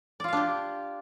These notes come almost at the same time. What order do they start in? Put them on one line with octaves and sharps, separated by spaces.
D5 F4 F5 D4 G4